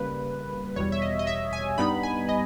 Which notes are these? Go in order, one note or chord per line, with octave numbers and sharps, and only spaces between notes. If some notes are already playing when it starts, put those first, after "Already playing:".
Already playing: C#3 G3 A#3 B4
E2 B2 G3 C#5
E5
D#5
D#5
E5
G#5
G2 G3 B3 D#4 B5
G#5
D#5